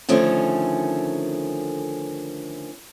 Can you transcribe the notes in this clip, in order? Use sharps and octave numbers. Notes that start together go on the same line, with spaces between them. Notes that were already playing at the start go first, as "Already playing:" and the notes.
D3 D#3 F3 A3 C#4